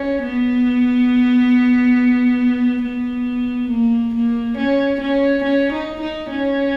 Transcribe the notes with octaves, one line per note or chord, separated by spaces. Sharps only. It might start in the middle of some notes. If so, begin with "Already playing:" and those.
Already playing: C#4
B3
B3
A#3
A#3
C#4
C#4
C#4
D#4
D#4
C#4